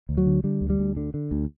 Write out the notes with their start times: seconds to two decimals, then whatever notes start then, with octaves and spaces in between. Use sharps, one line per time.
0.09 D2
0.17 F#3
0.26 D3
0.44 D3 G3
0.61 D2
0.70 G3
0.79 D2
0.97 D3
1.14 D3
1.31 D2